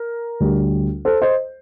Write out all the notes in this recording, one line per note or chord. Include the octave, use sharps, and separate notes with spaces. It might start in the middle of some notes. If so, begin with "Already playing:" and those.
Already playing: A#4
D2 D3 G3
A4 C5
C5 D#5